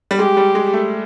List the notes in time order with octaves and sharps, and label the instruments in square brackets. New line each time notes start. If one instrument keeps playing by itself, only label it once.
[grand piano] G3
[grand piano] G#3 [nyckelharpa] G4
[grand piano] G3
G#3
A3